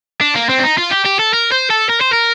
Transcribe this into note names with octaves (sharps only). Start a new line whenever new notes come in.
D4
A#3
C4
D4
D#4
F4
G4
G4
A4
A#4
C5
A4
A#4
C5
A#4